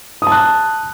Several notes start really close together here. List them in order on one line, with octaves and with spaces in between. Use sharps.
D#6 A5 F#6